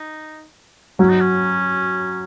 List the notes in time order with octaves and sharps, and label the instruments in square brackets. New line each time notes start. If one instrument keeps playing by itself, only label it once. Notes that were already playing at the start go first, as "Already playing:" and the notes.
Already playing: [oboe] D#4
[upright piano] F#3 [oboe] C#4
[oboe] D#4
C#4